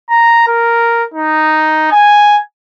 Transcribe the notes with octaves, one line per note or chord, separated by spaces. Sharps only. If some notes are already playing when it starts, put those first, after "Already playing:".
A#5
A#4
D#4
G#5